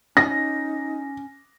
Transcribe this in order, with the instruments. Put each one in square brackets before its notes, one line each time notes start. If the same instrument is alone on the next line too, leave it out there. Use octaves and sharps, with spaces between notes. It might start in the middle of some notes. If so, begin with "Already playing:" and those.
[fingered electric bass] C#4 [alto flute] D#4 [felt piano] A#6